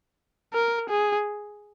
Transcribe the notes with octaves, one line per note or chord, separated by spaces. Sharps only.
A#4
G#4